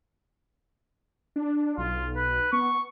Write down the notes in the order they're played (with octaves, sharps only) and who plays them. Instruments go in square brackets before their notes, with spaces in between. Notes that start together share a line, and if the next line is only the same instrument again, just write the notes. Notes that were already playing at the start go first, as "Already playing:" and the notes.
[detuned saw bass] D4
[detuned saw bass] B1 [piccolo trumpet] F4
[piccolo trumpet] B4
[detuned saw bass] B3 [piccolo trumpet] C#6